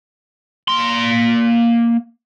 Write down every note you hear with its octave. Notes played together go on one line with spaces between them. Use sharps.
A#3 C6